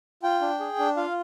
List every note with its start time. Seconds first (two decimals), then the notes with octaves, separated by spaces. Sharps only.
0.23 F4 G5
0.42 D4
0.60 G#4
0.79 D4
0.97 F4 F5